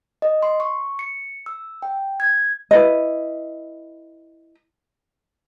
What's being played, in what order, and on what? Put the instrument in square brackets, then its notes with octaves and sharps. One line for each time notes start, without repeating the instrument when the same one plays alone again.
[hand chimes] D#5
C6
C#6
C#7
E6
G5
G#6
[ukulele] E4 B4 D#5